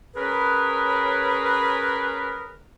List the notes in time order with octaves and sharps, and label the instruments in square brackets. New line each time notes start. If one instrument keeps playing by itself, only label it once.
[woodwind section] C#4 G#4 A#4 B4